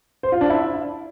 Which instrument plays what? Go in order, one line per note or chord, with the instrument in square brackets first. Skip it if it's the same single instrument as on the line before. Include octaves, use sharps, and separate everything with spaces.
[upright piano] C5
F4
D4
E4